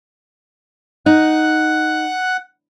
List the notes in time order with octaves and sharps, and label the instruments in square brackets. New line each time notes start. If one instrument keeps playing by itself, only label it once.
[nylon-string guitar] D#4 [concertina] F#5 F#6